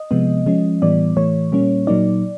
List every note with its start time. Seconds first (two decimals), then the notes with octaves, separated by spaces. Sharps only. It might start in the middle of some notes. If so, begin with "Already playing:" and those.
Already playing: D#5
0.11 C3 F3 G#3 B3
0.46 F3 G#3 C#4
0.82 A2 E3 G3 B3 D5
1.17 A2 E3 A3 C#5
1.52 A#2 G3 A#3 C#4
1.87 A#2 F#3 A#3 D#4 D5